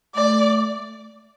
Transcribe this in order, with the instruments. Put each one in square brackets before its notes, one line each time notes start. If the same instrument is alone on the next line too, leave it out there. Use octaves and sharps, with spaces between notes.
[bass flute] A3 [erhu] D5